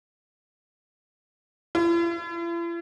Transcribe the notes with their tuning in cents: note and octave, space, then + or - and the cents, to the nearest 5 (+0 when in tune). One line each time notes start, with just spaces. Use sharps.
E4 +45